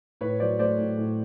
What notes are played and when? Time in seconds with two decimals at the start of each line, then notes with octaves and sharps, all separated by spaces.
0.21 A2 B4 C#5
0.40 F#3 C5 D5
0.59 A3 C5 D5
0.78 A2
0.97 A2